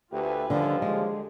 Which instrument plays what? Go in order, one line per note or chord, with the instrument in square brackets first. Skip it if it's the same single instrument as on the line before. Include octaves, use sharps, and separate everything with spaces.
[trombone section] D2 A3 G4 [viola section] F4 B4 G#5
[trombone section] D#2 F3 G3 [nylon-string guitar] D3
[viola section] D3 G4 G#4 [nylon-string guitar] G#3